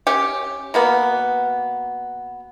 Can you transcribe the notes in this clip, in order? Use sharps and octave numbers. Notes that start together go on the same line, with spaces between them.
C#4 G4
B2 A#3 B3